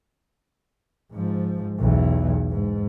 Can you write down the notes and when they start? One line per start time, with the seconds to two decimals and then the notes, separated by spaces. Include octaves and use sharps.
1.12 G#2 F3
1.79 B1 E2
2.50 G#2